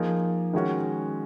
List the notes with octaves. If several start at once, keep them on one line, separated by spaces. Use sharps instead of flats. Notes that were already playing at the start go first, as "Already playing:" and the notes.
Already playing: F3 A#3 D#4 G#4
D#3 G#3 C#4 F#4